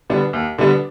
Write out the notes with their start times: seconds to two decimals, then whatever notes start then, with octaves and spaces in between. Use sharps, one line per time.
0.10 D3 G3 B3 D4
0.33 D#2
0.58 D3 G3 B3 D4